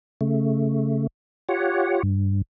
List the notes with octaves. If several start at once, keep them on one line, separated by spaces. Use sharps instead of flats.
C#3 A3
F4 G4 C#5 F#5
G2